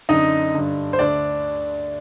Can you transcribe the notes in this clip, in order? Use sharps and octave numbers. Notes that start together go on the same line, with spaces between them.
F#2 D3 D#4 D#5
G2 D3
C5
D2 D3 D4 D5